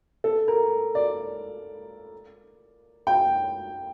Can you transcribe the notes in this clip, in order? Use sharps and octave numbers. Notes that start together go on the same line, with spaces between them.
A4
A#4
D5
G5